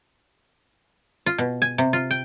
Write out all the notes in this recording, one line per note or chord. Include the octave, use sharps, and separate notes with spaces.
F4
B2
G#5
C3
F4
G5